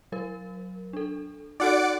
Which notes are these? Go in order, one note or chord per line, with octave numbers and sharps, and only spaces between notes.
F#3 A#4
D4 A4
D#4 F#4 A4 D5 F#5 D6